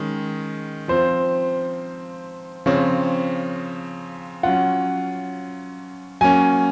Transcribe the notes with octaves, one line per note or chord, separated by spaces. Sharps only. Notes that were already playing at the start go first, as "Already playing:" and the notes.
Already playing: D#3 G#3 C#4
F3 C4 F4 C5
C#3 F3 C4 C#5
F#3 C#4 F4 F#5
F#3 A#3 C#4 G#5